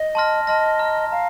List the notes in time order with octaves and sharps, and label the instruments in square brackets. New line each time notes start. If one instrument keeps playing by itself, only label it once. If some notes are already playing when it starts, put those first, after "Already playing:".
Already playing: [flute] D#5
[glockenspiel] A5 C6 F6 A#6
[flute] D#5 [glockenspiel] A5 C6 F6 A#6
[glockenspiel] A#5 F6 A#6
[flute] F5 [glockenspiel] A#5 F6